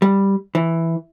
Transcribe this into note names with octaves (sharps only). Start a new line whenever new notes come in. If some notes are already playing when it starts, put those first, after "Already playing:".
G3
E3